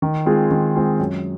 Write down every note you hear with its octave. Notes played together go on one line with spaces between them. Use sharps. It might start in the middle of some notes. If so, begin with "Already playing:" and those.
D#3
G#3 C4 F4 G#4
D#3
G#3 C4 F4 G#4
F#2